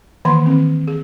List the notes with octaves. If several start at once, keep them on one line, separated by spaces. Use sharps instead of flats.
D#3 E3 A#3 C6
D#3 C4
G#4